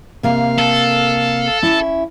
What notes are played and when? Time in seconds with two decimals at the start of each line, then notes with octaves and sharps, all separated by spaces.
0.23 C3 A#3 A#4 F5
0.58 A4
1.62 C#4 E4